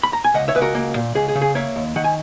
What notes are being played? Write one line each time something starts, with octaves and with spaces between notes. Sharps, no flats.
B5
A#5
G#5
C#2 D#5 F#5
C#5 E5
C#2 B4
F#4 A#4
A#3
A#2
C#2 G#4
G#4
C#3
G#4
A#3 C#5 E5
D#2
D#3 F#5
G#5